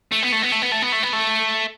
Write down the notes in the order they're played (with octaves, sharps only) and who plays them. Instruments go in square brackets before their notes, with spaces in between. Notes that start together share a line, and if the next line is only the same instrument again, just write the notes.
[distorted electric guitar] A3
B3
A3
B3
A3
B3
A3
B3
A3
B3
A3